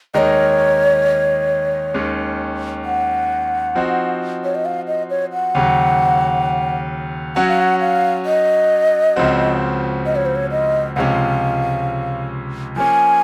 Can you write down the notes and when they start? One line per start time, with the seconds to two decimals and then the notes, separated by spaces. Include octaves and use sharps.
0.14 D#2 D#3 G#3 D#4 A#4 C#5 D#5
1.94 D#2 D#3 G#3 C#4
2.85 F#5
3.75 F3 C4 D#4 F#4
4.44 C#5
4.55 D#5
4.65 F5
4.87 D#5
5.10 C#5
5.33 F#5
5.55 D#2 C#3 F#3
7.36 F#3 C#4 F#4 F#5
7.48 F5
7.62 F#5
7.81 F5
8.25 D#5
9.16 C#2 C#3 F3 C4 F#4
10.06 D#5
10.16 C#5
10.26 C5
10.36 C#5
10.51 D#5
10.96 C#2 C3 F3 G#3 C#4 F5 F#5
12.76 F3 A#3 C#4 G#5